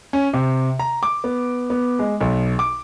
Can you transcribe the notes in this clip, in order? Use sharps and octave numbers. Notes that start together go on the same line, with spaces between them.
C#4
C3
A#5
D6
B3
B3
G#3
B1
D6